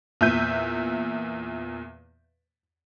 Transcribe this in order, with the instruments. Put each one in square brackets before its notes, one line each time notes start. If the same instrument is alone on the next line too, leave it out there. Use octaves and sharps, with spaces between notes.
[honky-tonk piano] E2 A#2 E5 G6 D#7